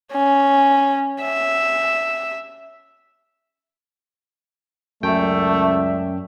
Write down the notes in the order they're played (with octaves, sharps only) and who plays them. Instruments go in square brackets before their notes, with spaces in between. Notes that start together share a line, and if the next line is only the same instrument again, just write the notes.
[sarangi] C#4
E5
[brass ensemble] C#2 D5 E5 [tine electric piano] F#2 G5 [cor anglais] A3